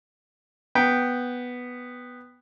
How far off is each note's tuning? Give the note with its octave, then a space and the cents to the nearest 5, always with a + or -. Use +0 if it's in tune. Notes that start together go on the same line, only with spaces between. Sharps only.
B3 +0 G5 +0